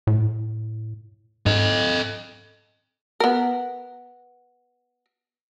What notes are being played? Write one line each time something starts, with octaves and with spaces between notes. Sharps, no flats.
A2
G#2 A4 D#5
B3 A#4